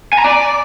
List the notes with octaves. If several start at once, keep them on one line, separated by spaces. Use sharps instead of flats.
G#5
A#5
D5